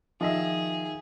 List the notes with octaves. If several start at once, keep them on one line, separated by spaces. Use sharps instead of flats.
D#3 F3 G#4 D#5 E5